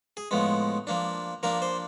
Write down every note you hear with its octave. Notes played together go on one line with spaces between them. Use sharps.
G#4
A2 F3 G#3 B3
F3 A#3 D4
F3 A#3 D4 A#4
C5